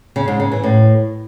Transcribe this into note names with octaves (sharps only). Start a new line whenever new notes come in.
C#3
G#2
C#3
E3
A2